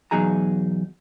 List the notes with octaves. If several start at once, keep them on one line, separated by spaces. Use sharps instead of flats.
E2 B2 F#3 D#4 G#4 A#5